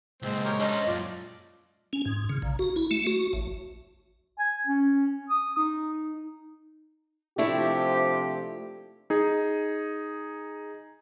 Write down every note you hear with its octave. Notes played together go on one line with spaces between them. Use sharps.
C#2 A#2 G#3 C4
G4 A#4 C#5
C#4 D4 A4 C5 D#5
F#2 A#2 F4 D5
C#4
G#2
C#3
A#1
F#4
E4
A3
F#4
A1
G#5
C#4
D#6
D#4
C3 F3 A3 D4 E4 G4
D#4 G#4